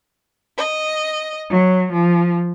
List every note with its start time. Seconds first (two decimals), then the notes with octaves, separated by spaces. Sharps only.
0.58 D#5
1.50 F#3
1.93 F3